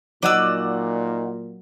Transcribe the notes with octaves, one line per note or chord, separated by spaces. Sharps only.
A#2 F#3 D#4 F#4 D5 F#5 E6 D#7